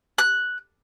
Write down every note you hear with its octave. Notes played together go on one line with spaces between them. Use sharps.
F#6